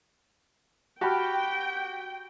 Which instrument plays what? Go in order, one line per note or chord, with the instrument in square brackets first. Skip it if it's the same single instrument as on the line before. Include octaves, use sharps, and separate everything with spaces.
[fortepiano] F#4 G4 [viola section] G5 [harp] A5 B5 F6